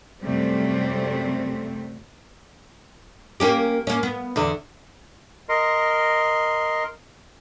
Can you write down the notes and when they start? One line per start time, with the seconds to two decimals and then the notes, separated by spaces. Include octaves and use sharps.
0.21 F#2 C3 G3 A3 C4
3.40 A#3 C#4 G4
3.87 A#3 C#4
4.03 B3
4.36 E2 D3
5.49 A#4 D#5 C6